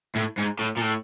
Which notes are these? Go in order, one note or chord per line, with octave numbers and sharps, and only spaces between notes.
A2
G#2
A2
A#2
A2